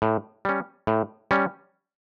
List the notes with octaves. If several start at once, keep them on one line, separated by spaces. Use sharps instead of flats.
A2
G3 C#4
A2
G3 C#4